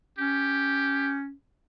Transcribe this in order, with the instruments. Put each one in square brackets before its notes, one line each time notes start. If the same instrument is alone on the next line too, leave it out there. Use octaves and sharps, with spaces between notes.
[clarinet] C#4 [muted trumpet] G4